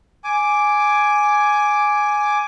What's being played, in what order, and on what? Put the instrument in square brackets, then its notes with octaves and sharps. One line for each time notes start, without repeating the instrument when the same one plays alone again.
[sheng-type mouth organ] G#5 D6